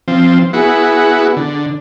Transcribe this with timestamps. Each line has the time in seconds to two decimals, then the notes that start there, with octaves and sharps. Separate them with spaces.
0.08 F3 C4
0.53 B3 E4 F#4 G#4
1.36 D3